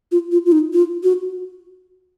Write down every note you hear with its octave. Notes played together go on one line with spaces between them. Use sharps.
F4
F4
F4
D#4
F4
F#4